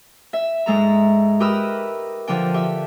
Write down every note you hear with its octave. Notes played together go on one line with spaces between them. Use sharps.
E5
G#2 G#3 A4 A#5
G4 A#4 B4 B5 D#6 E6
D3 F3 D4 G5
G4 E5